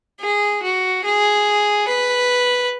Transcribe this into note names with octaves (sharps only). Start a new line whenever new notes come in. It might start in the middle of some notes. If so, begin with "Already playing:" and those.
G#4
F#4
G#4
B4